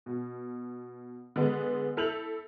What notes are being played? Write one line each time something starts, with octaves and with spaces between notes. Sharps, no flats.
B2
D3 G#3 B3
E4 A4 G6 F7 F#7